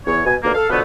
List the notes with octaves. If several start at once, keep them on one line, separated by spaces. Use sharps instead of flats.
E2 C#5
B2 G#5
D#2 B2 D3 A#3
A4 F5
B2 D3 F3 A3 B3